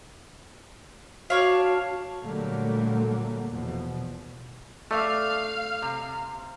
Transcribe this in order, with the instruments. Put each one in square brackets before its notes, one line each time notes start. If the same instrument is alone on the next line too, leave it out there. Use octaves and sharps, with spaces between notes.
[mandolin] D4 C#5 F5 [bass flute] F#4
[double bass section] A#2 D3 F#3 G3 A3 A#3
E2 B2 F3
[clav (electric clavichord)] A3 [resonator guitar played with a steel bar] D5 E5 [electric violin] F5 F6
[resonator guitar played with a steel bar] C3